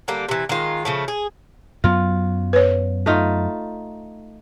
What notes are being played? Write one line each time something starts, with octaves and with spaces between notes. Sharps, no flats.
D3 G3 A#3
C3 E3
D#3 G#3 F4
C#3 F3 A3
G#4
F#2 F#3 B3 F4
B4 C#5
A3 D#4 F4